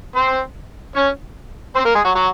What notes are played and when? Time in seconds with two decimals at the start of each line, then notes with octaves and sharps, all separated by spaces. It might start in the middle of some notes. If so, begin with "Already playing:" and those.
0.16 C4 C5
0.96 C#4 C#5
1.75 C4 C5
1.85 A#3 A#4
1.95 G#3 G#4
2.05 F#3 F#4
2.15 F#3 F#4